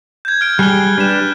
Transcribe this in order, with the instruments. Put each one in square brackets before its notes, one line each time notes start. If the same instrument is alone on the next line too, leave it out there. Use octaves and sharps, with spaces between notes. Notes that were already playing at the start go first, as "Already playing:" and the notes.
[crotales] G6 G#6
F6 G#6 D7
[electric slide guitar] G3 G#4 [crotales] F#6 G7
[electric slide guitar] D4 G4 B4 [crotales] F#6 E7